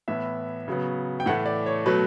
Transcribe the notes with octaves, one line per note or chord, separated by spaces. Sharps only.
A2 E3 B3 E5
C#3 F#3 B3
G5
A2 E3 A3 F#5
D5
C#5
B2 F#3 A3 B4